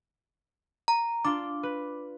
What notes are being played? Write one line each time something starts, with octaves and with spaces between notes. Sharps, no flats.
A#5
D4 F4 D6
B4